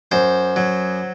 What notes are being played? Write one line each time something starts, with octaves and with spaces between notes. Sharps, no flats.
F#2 C5
F#3